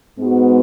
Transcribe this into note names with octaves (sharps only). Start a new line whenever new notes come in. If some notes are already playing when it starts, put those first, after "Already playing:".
G#2 G#3 B3 F#4